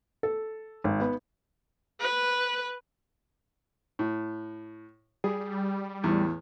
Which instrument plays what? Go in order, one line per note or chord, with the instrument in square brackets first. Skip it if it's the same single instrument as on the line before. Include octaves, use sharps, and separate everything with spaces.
[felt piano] A4
G#1
B3
[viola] B4
[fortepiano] A2
[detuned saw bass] G3 [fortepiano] G#4
[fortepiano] E2 A2